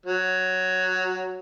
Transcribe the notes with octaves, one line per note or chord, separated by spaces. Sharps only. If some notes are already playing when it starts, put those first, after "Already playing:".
F#3